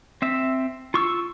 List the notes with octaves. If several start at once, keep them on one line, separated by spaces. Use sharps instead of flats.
C4 E5
F4 C#6 E6